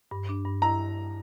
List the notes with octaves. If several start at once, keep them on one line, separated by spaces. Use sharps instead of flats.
G2
D4
G2
E4 A#5